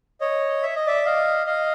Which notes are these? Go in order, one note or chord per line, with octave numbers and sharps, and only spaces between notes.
C#5 D#5
E5
D#5
D5 E5
D#5 F5
D#5 F5